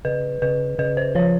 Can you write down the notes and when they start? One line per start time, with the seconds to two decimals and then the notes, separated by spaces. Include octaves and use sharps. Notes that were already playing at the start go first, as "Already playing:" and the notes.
0.05 C#3 B4
0.42 C#3 B4
0.78 C#3 B4
0.97 C5
1.15 F3 C#5